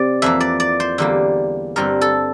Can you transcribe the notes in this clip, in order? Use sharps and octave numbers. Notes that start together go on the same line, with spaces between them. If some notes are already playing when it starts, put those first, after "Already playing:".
Already playing: C3 C4 D5
F2 E3 A#3 E5
D5
D5
C5
E2 D3 G3 A#3
G2 D3 G3 C4 A#4
A4